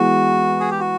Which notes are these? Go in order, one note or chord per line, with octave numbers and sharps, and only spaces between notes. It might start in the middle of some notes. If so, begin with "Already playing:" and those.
Already playing: E3 G#3 B3 F#4
G#4
G4
F#4